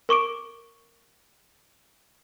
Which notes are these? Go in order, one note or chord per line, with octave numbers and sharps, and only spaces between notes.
A#4 C#6 D6 D7